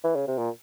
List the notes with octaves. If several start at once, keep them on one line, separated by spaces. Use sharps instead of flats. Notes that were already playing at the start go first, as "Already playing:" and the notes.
E3
C#3
C3
A#2